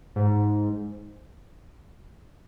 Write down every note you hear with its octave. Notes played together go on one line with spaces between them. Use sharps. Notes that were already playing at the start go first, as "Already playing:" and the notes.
G#2